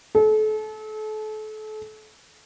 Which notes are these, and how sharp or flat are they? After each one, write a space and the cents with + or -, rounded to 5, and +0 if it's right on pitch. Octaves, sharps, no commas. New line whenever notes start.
A4 -35